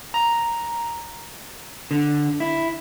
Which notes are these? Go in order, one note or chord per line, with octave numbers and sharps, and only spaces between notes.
A#5
D3
E4